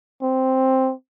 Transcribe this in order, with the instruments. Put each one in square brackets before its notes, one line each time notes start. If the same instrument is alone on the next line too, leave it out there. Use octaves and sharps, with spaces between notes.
[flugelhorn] C4